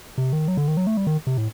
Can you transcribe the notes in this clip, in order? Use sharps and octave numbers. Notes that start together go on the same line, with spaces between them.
C3
D#3
F#3
D3
D#3
F#3
A3
G3
D#3
C3
A2